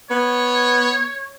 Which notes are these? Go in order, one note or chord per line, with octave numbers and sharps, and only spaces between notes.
B3 C#5